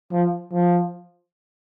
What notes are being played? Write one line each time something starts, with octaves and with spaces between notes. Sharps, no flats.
F3
F3